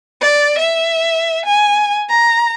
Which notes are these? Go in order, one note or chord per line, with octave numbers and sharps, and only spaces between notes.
D5
E5
G#5
A#5